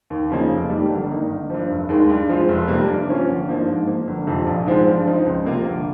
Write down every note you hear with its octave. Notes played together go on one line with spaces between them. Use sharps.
D#2
C#3 F3 A#3 D#4
F1
F2 D#3 G3 A#3
G1
G2 D#3 A#3 D#4
G1
G2 F3
F1
D#2 D#3 G#3
G2
F3 G#3 C4 F4
F1
F2 C3 G3 A#3
G2
F3 A#3 C#4 F4
G1
G2 F3 A#3 D#4
G#2
F3 A#3
G1
F2 C3 F3
A#1
G#2 F3 G#3 C4
G2
F3 C4 D#4
C#2
C3 F3 A#3 F4
G1